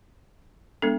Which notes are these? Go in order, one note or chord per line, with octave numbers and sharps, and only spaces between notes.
G#3 B3 D4 A4